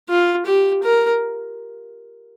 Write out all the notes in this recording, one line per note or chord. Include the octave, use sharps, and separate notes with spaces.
F4
G4
A#4